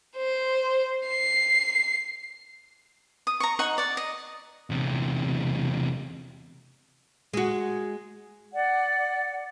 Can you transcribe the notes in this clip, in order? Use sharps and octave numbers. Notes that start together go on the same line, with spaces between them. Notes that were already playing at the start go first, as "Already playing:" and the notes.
C5
C7
D#6
A#5 C#6
D#4 C#5 F#5 C#6
D5 F#5
D#5
E2 C3
G#3 F#4
D5 F#5